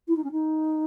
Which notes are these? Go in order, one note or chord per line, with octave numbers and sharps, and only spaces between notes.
E4
D#4
C#4
D#4